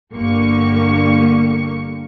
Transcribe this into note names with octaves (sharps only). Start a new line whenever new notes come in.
G1 D3 A#3 G4 C#6 C#7